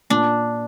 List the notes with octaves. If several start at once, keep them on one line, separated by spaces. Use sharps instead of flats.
A#2 D4